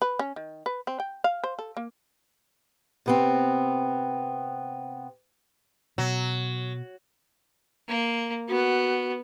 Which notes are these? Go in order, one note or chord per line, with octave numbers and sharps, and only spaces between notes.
B4
C#4
D#3
B4
C4
G5
F5
C5
A4
A#3
C3 B3 C4
B2 F#3
A#3
B3 F#4